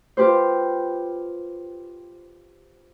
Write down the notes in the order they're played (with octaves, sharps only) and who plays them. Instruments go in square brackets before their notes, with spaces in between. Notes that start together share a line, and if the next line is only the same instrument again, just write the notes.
[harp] F4 G4 B4 C5